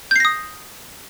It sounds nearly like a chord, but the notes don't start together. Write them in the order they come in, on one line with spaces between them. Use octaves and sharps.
G6 C7 A#6 D#6